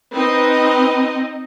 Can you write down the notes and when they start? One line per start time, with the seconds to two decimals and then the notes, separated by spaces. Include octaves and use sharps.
0.13 C4 D#4 B4 D#5